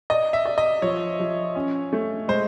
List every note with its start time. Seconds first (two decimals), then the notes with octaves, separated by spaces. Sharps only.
0.10 D5 D#5
0.33 E5
0.45 D5
0.58 D#5
0.82 F3 C#5
1.20 F3
1.55 C#4
1.93 A3
2.28 G#3 C5